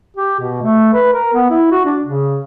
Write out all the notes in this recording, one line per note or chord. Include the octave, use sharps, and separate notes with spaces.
G4
B2
A3
B4
A#4
B3
E4
F#4
D4
C#3